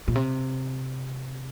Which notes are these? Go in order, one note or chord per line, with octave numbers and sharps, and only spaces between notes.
A#2
C3